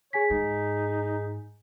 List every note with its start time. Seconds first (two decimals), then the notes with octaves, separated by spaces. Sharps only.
0.13 G#4 C#5 G#5 B6
0.30 G#2 D#4